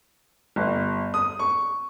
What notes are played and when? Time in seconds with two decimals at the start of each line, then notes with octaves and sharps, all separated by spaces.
0.56 G1
1.14 D#6
1.39 C#6